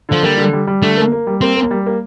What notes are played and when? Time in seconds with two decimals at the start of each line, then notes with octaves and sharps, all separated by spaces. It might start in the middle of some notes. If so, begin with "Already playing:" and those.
0.09 D3 F3
0.23 G3 A#3
0.38 D3
0.53 G3
0.67 G3
0.82 D3 A3
0.97 A#3
1.12 A#3
1.27 G3
1.41 A#3 C4
1.56 A#3
1.71 G3
1.86 A#3